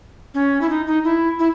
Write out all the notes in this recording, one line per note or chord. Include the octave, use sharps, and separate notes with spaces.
C#4
E4
D#4
D#4
E4
E4